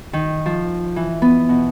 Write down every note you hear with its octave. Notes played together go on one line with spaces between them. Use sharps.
D#3
F3
E3
B3
B2